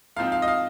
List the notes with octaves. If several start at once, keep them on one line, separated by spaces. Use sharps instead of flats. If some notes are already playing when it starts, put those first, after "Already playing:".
G#2 F3 C4 D#4 F5
F5
D#5
F5